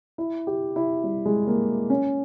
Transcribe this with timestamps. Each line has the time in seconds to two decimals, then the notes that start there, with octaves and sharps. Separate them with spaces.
0.18 E4
0.47 G4
0.76 E4
1.04 G3
1.26 G#3
1.47 A#3
1.90 C#4